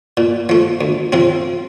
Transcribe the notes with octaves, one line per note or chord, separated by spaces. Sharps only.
A#2
F3 A3
D2
C3 F3 C4